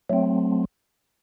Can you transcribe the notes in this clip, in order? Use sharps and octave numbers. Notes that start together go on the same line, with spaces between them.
F#3 A3 C4